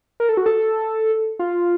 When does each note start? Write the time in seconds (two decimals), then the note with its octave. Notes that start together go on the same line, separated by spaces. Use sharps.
0.20 A#4
0.29 A4
0.37 F#4
0.46 A4
1.39 F4